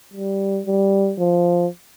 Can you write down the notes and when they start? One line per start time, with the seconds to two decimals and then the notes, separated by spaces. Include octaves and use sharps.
0.13 G3
0.66 G3
1.19 F3